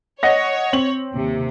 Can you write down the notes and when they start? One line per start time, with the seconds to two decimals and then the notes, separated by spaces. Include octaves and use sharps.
0.23 C#5 D#5 F#5 A#6
0.73 C4 F#7
1.14 D#2 C3